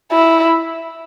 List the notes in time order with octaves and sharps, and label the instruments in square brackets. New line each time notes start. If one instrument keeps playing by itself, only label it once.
[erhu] E4